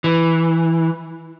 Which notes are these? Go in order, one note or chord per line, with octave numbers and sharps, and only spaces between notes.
E3